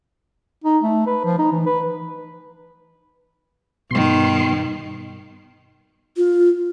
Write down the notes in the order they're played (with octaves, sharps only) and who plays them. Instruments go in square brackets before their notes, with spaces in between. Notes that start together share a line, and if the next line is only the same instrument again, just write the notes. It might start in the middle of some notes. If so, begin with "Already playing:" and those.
[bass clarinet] D#4
A3
B4
F3
D#4
E3
B4
[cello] G2 D#3 [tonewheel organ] B2 C6
[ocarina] F4